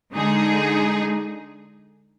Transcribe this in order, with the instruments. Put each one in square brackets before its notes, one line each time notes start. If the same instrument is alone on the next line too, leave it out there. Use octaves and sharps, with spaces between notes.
[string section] D3 G#3 D#4 G#4